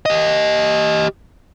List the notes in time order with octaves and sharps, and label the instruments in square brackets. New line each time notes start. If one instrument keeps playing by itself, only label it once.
[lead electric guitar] G4 D#5